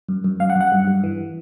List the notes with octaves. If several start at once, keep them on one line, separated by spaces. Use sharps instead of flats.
F#2
F#2
F#2 F5
F#5
F#2
F#5
G2
G2
E3